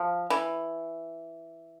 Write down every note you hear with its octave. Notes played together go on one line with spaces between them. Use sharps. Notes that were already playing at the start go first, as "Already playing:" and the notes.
Already playing: F3
E3